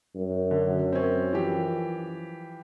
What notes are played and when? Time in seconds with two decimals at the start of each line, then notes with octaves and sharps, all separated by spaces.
0.16 F#2
0.51 D3
0.92 C4 C#4
1.33 E3 F3 G4